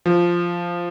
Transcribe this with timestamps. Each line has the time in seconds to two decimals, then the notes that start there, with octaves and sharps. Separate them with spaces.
0.06 F3